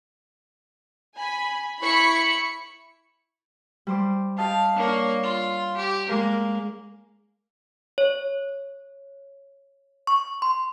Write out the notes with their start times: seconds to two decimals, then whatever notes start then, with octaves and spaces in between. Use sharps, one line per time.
1.17 G#5 B5
1.81 E4 B5 C#6 C#7
3.87 G3 C5 D6
4.38 G4 D#5 F5 A5
4.76 A#3 D4 C#5
5.23 F4
5.77 G4
6.09 G#3 A#3 A#4
7.98 C#5
10.07 C#6
10.42 C6